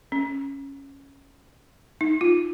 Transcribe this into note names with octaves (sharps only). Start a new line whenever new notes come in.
C#4
D#4
F4